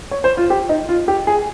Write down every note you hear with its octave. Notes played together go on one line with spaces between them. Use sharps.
C#5
C5
F4
G4
D#4
F4
G4
G#4